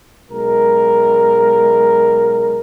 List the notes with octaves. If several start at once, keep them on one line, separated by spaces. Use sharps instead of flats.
B1 G#3 A#4